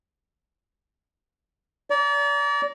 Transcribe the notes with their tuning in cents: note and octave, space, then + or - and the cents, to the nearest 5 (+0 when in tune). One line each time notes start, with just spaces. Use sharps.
D5 -35 A#5 +0